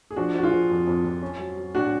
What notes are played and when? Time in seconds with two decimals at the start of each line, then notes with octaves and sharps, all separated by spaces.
0.11 G#4
0.16 F3 D4 F#4
0.34 F3 F#4
0.43 F4 G#4
0.53 F3
0.70 F2
0.87 F2
1.05 F2
1.23 C#4
1.39 F#3
1.57 F#3
1.75 A2 D4 F#4